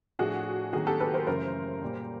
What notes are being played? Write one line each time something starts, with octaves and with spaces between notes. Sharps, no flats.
A2 F3 A3 D4 F#4 G#4
D#3 F#3 A#3 F#4 G#4
G4 A4
A4 B4
A#4 C5
F#2 C#3 E3 A3 A#4 C5
A#2 G3 A#3